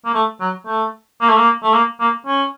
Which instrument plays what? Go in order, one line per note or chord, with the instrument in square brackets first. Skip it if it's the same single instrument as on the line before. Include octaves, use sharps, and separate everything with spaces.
[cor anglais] A#3
A3
F#3
A3
A#3
A3
A#3
A3
A#3
A#3
C#4